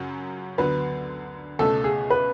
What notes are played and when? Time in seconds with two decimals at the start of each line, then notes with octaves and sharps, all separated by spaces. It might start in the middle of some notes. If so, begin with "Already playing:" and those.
Already playing: F#2 C#3 F#3 C#4 F#4
0.58 D2 D3 F#3 B3 B4
1.59 C#2 B2 A3 C#4 A4
1.84 G#4
2.10 B4